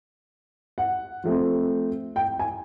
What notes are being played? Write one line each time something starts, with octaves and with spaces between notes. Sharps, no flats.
F#5
F3 A3 C4
G5
G#5